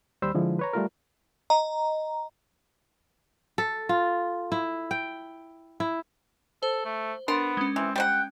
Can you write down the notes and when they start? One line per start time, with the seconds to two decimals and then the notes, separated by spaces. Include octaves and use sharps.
0.22 D#2 G3 C5 B5 E6
0.35 D3 F3 G#3 E4
0.59 B4 C#5 A#5
0.73 G3 A3 F4 A#4
1.50 D#5 A#5
3.58 A4
3.89 F4
4.52 E4
4.91 G5
5.80 E4
6.63 A4 C5
6.85 A3
7.28 B3 D4 A#4 C6
7.57 G#3 C#4
7.76 E3 C4
7.96 G3 C5 F#5 G5